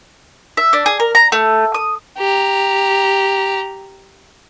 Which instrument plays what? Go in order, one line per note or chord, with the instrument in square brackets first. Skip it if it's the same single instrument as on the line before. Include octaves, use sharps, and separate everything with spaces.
[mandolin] E5
D4
G#4
A#4
A#5
A3
D#6
[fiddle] G4 A#5